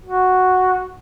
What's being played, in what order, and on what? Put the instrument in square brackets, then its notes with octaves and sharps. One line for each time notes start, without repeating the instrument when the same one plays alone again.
[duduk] F#4